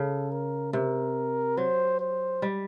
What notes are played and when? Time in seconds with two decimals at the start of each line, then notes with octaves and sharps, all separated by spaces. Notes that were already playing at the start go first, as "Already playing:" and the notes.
Already playing: C#3 A4
0.31 A#4
0.73 C3 A#4
1.57 F#3 C5
2.00 C5
2.42 G3